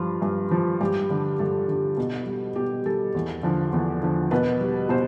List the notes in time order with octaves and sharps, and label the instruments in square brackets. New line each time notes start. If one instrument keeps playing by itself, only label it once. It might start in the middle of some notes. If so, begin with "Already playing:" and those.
Already playing: [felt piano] G2 F3 F4
G2
F3
G2 G4
D3 G3
G2 A4
D3 G3
B2
G3
B2 G4
G3 A4
E2
D3 F3
E2
D3 F3
B2 B4
G3
B2 C5